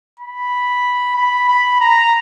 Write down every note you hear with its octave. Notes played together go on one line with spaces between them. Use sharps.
B5
B5
B5
A#5